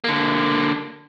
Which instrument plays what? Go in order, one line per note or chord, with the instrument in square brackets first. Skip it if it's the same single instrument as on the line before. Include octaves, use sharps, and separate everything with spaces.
[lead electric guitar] D3 A#3